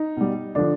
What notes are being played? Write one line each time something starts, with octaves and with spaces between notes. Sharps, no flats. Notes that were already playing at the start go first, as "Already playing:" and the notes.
Already playing: D#4
B2 G3
D3 F3 D4